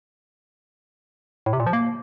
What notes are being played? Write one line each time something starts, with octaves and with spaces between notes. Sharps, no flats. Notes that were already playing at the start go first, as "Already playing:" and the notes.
A2
C3
A#2
F3
A#3